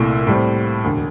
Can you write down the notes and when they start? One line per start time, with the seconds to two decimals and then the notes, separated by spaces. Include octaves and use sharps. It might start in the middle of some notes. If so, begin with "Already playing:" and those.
Already playing: C2 A#2 A3 E4
0.27 A2 G3 C4
0.84 E1 D2 D3